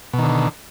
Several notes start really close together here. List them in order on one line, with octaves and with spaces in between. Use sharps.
B2 D#3 D3